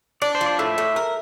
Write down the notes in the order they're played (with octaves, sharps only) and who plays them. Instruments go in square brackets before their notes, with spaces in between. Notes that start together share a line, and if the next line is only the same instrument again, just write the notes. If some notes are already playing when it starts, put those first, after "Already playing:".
[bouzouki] D4 [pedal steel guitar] D5
[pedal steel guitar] C5
[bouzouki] F3
[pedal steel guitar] D5
[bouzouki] A2 [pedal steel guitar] E5
[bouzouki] A2
A#4